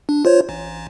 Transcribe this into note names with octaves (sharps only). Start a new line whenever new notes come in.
D4
F4 C5 C#5
A1